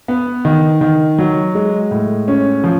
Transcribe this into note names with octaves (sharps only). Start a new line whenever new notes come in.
B3
D#3
D#3
F#3
G#3
A2
C#4
F3